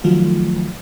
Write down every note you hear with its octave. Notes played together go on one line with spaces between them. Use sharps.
D#3 F3 F#3 A3 F4